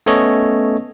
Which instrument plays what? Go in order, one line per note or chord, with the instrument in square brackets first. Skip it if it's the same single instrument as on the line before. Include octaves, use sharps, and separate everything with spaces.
[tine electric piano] A3 B3 C#4 A4 C#5 D#5